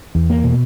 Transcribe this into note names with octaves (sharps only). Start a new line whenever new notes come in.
E2
A#3
B2